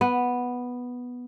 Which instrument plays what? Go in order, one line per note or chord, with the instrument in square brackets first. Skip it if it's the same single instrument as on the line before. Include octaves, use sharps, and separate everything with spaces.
[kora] B3